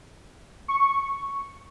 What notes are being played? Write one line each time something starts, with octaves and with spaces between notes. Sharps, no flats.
C#6